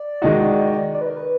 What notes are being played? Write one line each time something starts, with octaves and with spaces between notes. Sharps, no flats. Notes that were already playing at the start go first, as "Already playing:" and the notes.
Already playing: D5
D#3 G#3 D#4 F#4
D5
B4
A#4
B4